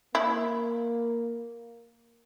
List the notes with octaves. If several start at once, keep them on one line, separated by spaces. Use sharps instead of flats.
A#3 E4